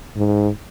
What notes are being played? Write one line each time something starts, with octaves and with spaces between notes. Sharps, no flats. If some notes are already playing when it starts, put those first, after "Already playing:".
G#2